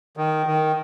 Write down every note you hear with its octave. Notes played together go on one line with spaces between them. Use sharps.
D#3
D#3